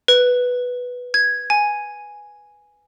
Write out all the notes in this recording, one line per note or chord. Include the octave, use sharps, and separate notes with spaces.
B4
G#6
G#5